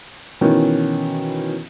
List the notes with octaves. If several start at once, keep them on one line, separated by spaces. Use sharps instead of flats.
B2 D#3 E3 C#4